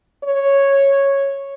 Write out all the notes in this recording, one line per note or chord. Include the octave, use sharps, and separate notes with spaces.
C#5